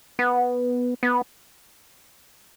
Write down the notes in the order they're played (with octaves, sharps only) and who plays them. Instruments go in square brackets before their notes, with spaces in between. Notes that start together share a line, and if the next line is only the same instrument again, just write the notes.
[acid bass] B3
B3